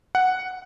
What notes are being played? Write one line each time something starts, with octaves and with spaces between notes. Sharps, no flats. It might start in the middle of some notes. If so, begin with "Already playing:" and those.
F#5